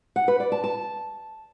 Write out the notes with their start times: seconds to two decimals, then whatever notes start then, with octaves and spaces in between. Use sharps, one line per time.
0.16 F#5
0.28 B4
0.40 D5
0.52 A5
0.64 A5